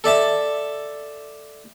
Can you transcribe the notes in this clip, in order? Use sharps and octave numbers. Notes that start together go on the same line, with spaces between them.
A4 D5 E5 A5